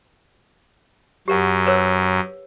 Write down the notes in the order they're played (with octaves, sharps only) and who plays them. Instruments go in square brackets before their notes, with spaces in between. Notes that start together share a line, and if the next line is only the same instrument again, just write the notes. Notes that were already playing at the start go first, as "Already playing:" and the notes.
[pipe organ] F#2 [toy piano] G4 A#4 F#5
[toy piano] B4 C#5 E6